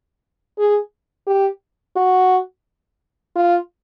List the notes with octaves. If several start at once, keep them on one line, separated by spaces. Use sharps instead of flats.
G#4
G4
F#4
F4